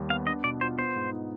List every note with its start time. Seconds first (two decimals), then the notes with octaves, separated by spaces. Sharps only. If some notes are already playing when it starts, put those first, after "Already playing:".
Already playing: D#2 G3
0.10 B3 F5
0.27 D4 D#5
0.44 B2 D5
0.61 F4 C5
0.78 B3 C5
0.96 G#2
1.12 D#4